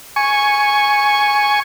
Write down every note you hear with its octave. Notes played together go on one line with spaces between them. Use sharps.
G#5 C#6